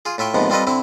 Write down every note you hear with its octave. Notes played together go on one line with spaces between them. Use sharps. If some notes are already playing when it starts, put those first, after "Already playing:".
F4 G#4
A2 F4 E5 G5 C#6
D#2 G#2 C3 F3 B3
G3 C4 F4 A4 B4 D#5
D3 C4 E4